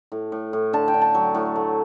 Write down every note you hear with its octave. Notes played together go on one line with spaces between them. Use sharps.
A2
A2
A2
D3 A5
G5
D3
A5
F#3
A2
A3